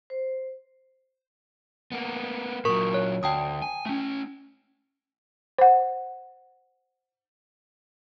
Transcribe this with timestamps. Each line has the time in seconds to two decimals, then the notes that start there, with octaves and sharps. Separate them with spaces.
0.10 C5
1.92 A#3 B3
2.65 A#2 F#3 A#4 C#6
2.94 C#5
3.23 D2 G5 A5 D#6
3.62 G#5
3.86 A3 C#4
5.58 C5 F#5